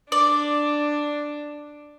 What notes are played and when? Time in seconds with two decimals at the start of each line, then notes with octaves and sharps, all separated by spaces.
0.12 D4 D5